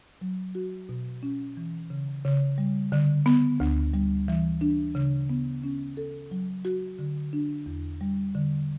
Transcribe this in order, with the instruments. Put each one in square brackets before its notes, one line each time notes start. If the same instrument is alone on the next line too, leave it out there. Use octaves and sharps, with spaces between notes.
[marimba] F#3
F#4
B2
C#4
E3
C#3
C#3
G3
D3
B3
D2
G3
E3
D4
C#3
B3
C#4
A4
F#3
F#4
D3
D4
E2
G3
D3